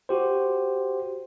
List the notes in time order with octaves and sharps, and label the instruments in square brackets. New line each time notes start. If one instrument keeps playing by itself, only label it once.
[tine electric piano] F#4 G4 C5